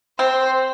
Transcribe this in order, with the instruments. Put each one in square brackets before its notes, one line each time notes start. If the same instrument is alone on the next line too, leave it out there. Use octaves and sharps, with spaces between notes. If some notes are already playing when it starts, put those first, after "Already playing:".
[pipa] C4 [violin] C5